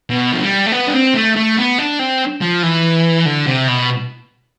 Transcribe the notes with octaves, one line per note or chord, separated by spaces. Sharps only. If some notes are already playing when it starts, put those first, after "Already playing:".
B2
F3
G3
A3
B3
D4
C4
A3
A3
B3
D4
C4
F3
E3
D3
C3
B2